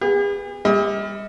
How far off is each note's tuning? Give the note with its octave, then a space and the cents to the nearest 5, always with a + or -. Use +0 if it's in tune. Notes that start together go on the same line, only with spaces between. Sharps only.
B3 +0 G#4 -45
G3 +35 D#5 +45